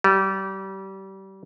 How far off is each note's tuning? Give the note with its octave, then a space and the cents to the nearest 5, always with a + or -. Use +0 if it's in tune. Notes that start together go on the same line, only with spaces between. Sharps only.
G3 -25